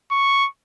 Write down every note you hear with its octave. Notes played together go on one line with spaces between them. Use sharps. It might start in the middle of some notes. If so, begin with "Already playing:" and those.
C#6